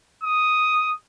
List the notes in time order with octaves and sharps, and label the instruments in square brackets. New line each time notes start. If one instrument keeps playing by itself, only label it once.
[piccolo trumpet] D#6